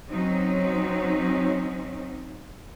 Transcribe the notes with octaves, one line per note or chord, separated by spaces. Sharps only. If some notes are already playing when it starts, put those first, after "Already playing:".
F#3 C4 C#4 D#4